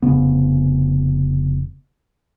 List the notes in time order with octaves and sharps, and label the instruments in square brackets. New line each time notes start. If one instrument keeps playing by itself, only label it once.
[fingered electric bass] F1 C#3 B3